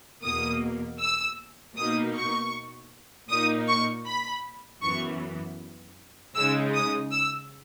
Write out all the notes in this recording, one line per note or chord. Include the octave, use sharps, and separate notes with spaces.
E2 B2 A#3 D#6
E6
B2 A#3 D#4 D#6
C#6
A#2 A#3 D#4 D#6
C#6
B5
F#2 E3 B3 C#6
C#3 G#3 D#4 E6
D#6
E6